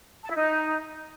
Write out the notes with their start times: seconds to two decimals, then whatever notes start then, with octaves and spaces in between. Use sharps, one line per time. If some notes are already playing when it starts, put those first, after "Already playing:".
0.24 A5
0.30 E4
0.35 D#4